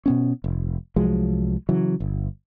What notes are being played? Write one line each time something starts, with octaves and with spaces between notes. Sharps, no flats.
B2 B3 C#4
F1
C2 F3 F#3 G#3
C#3 E3 F#3
G1